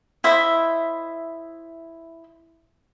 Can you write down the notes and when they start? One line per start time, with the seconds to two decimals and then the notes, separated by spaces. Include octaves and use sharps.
0.24 E4 C5 D#5 E5